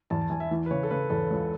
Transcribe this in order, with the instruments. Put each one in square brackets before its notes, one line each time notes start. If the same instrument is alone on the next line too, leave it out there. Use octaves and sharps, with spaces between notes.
[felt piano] E2 [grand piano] A5
[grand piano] A5
[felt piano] E2 [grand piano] G#5
[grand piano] E5
[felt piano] E3
[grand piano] B4
[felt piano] C#3 [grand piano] C#5
[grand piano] A4
[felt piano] C#3 [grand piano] B4
[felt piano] E2 [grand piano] A4
[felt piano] C#2